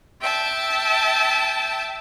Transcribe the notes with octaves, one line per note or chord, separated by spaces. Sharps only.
E5 G5 A5